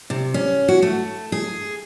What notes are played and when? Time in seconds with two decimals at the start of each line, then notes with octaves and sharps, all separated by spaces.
0.10 C3
0.34 C#4
0.68 F#4
0.82 A3
1.32 G#4